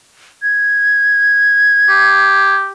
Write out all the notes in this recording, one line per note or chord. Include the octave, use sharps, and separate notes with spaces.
G#6
G4